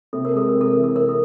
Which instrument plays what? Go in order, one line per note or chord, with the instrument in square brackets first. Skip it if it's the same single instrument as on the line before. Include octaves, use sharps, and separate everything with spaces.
[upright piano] C3 [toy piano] A4
[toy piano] A#4
[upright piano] G#3 [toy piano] A4
[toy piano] A#4
[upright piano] C3
[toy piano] A4
[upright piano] E3 [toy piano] A#4
[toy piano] A4
[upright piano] C3 [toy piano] A#4
[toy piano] A4